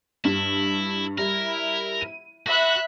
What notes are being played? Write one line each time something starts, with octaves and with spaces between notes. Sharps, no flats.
G2 E4
G3 E4 A#4
D#7
F#4 E5 B5 F#6